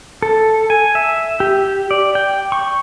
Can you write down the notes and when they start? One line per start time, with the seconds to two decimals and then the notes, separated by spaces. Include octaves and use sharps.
0.22 A4
0.70 G#5
0.95 E5
1.40 G4
1.91 D5
2.15 G5
2.52 C#6